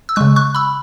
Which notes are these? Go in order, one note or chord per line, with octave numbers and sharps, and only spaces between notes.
E6
C#3 G#3 C#6 F#6
C#6 F#6
B5 E6